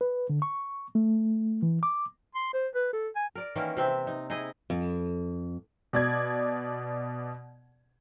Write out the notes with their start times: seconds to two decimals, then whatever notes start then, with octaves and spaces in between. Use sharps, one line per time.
0.01 B4
0.30 D3
0.42 C#6
0.95 A3
1.62 E3
1.83 D6
2.35 C6
2.53 C5
2.75 B4
2.93 A4
3.16 G#5
3.35 A#4 D5
3.56 D#3 E3 A#3 C#4
3.77 C3 C4 E5
4.07 D#4
4.30 D#4 E4 G#4 D#5
4.70 F2
5.93 B2 D5 G#6